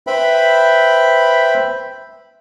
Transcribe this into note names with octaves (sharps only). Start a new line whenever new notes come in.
B4 C5 E5 G5 B5